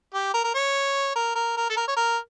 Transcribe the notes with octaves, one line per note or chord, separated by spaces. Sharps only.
G4
A#4
A#4
C#5
A#4
A#4
A#4
A4
A#4
C#5
A#4